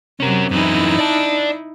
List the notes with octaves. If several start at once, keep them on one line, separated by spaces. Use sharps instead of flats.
C3 F#3 C#4 A#4
F#2 E3 D#4 E4
D5 A5